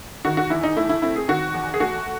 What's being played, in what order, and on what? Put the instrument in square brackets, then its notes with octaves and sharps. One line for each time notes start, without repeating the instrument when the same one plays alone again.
[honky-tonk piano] D#3 F#4
F#4
E2 E4
D#4
A3 E4
E4
C4 E4
G#4
D#3 F#4
E2
G#4
A3 F#4